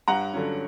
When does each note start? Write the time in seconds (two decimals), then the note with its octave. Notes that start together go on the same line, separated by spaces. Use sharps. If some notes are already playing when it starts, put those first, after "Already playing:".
0.08 G2 F#5 A#5
0.33 D3 F#3 C#4